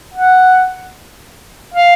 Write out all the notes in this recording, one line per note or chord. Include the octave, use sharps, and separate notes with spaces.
F#5
F5